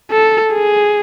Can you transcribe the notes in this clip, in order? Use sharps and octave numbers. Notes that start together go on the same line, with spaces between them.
A4
G#4